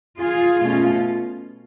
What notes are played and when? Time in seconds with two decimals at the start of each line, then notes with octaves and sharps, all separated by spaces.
0.19 F4 G#4
0.61 B2 A3 C#4 F4